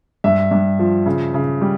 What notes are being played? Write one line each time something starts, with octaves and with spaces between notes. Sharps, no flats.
G2 E5
G2
F3
C#3
C#3
G3